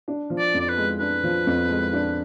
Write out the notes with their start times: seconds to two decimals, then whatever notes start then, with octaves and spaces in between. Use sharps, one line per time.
0.08 D4
0.30 F3
0.39 D5
0.54 F2
0.60 D5
0.69 B4
0.77 G#3
1.00 D4 B4
1.23 F3
1.47 F2
1.69 G#3
1.93 D4